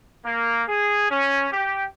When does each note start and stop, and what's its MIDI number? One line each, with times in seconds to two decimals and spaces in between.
0.25 0.63 58
0.69 1.09 68
1.11 1.47 61
1.52 1.84 67